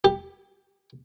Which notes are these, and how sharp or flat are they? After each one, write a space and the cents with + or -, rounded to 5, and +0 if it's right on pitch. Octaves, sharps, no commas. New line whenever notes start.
G4 +10